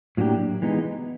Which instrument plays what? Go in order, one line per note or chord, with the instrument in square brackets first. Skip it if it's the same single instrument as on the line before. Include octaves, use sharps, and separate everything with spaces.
[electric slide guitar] A2 F#3 A#3 D4 G4
E3 G#3 B3 D#4